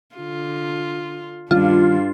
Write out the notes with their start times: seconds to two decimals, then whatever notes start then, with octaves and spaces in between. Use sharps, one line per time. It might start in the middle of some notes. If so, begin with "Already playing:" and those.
0.16 D3 F4
1.51 G2 D#3 G3 C#4 D4 F4